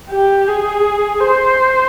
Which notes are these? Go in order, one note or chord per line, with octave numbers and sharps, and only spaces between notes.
G4
G#4
C5